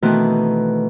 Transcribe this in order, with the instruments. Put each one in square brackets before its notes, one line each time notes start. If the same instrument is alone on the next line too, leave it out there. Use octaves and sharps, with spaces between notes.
[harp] B2 D#3 E3 A3 C4